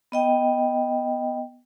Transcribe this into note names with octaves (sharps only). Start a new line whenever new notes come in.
B3 D#5 G5